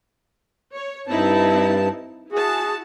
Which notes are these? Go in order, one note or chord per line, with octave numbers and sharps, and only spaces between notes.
C#5
G2 C4 D#4 E4 A5
E4 F#4 G#4 A5